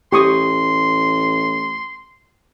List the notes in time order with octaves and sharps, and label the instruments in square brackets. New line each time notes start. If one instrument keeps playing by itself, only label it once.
[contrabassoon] A1 [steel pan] G4 C#6 D#6 [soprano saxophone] C6